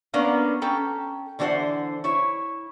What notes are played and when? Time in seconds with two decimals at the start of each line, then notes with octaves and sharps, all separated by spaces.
0.13 A#3 B3 C#4 D4 A#4 F5
0.61 C#4 A4 G5 A#5
1.39 D3 E3 D4 G4 C5 F#5
2.04 E4 C#5